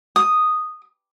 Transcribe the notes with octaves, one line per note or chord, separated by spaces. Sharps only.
D#6